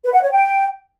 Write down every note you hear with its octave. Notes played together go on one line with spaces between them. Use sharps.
B4
F#5
C#5
G5